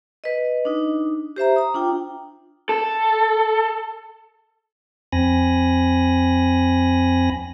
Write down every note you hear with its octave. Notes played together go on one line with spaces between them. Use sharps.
B4 D#5
D4 D#4
G4 C5 E5 A#5
A#5 D#6
D4 F4 G5
A4
F2 C4 G#5 B5 A#6